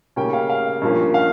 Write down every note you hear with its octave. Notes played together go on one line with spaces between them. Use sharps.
C#3 G3 A#3 C#4 G5
F5
F5
G2 F3 A#3 C#4
F5